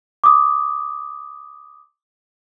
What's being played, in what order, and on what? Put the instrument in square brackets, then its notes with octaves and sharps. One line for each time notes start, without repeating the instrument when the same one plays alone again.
[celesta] D6 D#6